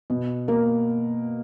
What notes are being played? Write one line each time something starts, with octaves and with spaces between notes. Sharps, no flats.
B2
A#3